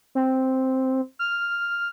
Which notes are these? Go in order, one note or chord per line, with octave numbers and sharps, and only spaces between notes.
C4
F6